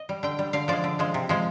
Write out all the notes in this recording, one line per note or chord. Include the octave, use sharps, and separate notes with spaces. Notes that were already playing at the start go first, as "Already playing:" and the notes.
Already playing: D#5
G3
D3 G5
G3
D3 F5
F3 G#3 D5
D3
F3 G#3
C3
F3 G#3